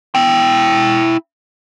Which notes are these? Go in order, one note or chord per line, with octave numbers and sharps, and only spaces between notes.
E4 G5